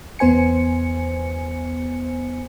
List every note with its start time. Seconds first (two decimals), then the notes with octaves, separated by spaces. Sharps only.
0.19 E2 B3 C5 G#5 C#7